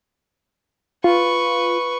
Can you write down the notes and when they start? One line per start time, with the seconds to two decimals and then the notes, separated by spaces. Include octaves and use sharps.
1.04 F4 B4 C#6